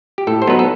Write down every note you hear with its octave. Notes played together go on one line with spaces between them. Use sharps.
G4
A2 A4
C5
F#3 B3 D#4 B4
A4